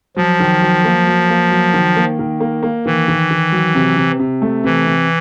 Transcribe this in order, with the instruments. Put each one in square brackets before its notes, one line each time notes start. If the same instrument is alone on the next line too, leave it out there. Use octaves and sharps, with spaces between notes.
[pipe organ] F3 [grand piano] F#3
[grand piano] D#3
F#3
A#3
F#3
A#3
F#3
D#3
A#3
D#3
A#3
A#3
[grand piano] D#3 [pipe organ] E3
[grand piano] D#3
D#3
F#3
C3
C3
C3
A3
[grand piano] C3 [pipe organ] E3
[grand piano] C3